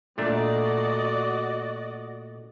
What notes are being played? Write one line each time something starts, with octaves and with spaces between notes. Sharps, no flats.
A#2 A3 D4 F#4 D5 D#5